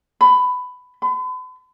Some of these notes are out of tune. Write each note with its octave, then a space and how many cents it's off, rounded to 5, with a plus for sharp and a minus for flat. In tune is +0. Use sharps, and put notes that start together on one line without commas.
B5 +15
B5 +45